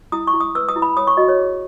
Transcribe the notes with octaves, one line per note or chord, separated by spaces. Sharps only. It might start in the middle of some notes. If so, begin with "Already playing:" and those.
E4 D#6
C#6
E4
D#6
B4 E6
D#6
E4
B5
C#5 D#6
C#6
F#4 D#5
C#5
G#4